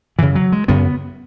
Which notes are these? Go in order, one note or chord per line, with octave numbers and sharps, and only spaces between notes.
F#2 C#3 E3
F#3
G#3
F#2 C#3 B3